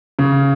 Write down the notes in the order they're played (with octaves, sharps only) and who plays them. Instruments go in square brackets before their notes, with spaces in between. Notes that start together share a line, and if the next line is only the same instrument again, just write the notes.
[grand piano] C#3